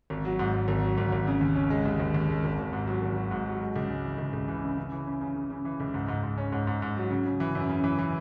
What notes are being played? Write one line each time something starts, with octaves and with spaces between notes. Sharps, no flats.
G#1
F#3
G#2
G#2
G#1
F#3
G#1
G#1
C#3
D#2
C#4
G#3
D#2
D#2
D#2
G#3
G#1
G#1
G#2
F#3
G#1
F#3
G#2
F#3
G#3
C#2
G#3
E3
C#2
C#2
E3
C#3
C#3
E3
C#3
C#3
C#3
C#3
E3
C#2
G#2
G#2
G#2
C#4
G#2
G#2
G#2
F#3
C#3
C#3
E3
F#2
C#3
E3
E3